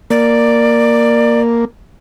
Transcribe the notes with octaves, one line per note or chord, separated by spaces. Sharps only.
A#3 D5